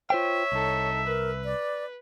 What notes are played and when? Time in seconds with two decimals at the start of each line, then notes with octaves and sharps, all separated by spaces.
0.10 F4 C5 C#5 E5 G5
0.52 C2 D#4 A4
1.07 A#4 B4
1.45 D5